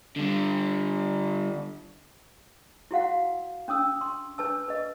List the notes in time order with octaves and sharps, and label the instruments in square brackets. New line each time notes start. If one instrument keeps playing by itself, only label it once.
[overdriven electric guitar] D3 G3
[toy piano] E4 F#4 F5 F#5
C#4 D4 D#6 E6
C6
D4 B4 A5 E6
B4 D#5